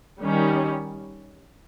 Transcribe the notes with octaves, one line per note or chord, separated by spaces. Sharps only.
D#3 G3 C#4